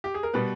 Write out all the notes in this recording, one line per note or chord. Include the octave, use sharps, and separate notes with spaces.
G4
G#4
A#4
B2 G3 B3 B4